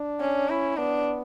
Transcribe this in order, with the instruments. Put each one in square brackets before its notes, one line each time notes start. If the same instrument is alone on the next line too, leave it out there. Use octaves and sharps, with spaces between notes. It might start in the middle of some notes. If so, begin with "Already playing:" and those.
Already playing: [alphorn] D4
[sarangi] C#4
[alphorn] C#4 [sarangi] E4
[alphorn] B3 [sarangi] D4